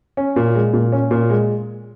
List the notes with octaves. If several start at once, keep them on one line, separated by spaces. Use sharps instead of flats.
C#4
A#2
G#3
A#2
C#4
A#2
G#3